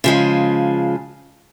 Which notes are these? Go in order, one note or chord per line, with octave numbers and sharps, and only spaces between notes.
C#3 F3 G#3